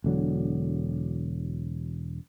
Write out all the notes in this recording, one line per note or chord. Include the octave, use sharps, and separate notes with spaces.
E1 D3 F#3